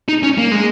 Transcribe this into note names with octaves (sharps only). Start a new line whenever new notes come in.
D#4
C#4
A#3
G#3